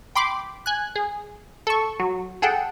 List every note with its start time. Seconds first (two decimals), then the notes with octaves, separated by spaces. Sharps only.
0.15 G5 B5 C6 D6
0.66 G#5 F#6
0.96 G#4
1.67 A4 C#6
2.00 F#3
2.42 G#4 A4 F#5 G5